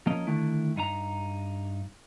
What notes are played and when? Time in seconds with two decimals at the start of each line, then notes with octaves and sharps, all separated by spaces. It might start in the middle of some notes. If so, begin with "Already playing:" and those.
0.07 F3 A#3 C#4 A#4 D#5
0.27 D3 D#3 A3 E4
0.76 G2 D#4 E4 A#5